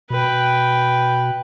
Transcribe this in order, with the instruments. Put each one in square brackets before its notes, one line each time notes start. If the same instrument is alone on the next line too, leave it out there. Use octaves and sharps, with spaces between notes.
[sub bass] B2 [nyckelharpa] B4 G5